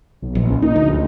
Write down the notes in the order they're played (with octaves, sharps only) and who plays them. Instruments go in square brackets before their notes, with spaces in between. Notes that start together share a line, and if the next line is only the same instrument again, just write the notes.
[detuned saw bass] B1
[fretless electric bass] A#1
[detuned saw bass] C#2
[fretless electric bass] A#2 [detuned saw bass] D#4
[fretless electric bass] D2
[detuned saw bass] C#2